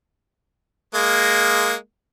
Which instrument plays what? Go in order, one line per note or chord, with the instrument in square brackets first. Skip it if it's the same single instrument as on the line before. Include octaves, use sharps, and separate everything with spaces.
[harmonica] G#3 A#3